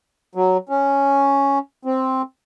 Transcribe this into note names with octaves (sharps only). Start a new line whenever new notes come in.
F#3
C#4
C4